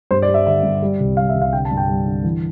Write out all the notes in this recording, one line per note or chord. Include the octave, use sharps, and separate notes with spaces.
G2 C5
D5
G3
E5
D3 E5
G2
G3
C2
G3 F5
E5
C2
F5
D3 G5
A5
G2
G5
G3
D3
E3